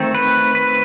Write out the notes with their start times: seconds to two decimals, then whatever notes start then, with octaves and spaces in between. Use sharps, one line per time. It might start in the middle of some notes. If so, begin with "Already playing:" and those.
Already playing: D#3 A3 C4
0.15 B4
0.55 B4